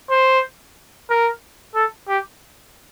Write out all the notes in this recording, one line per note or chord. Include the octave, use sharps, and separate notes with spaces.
C5
A#4
A4
G4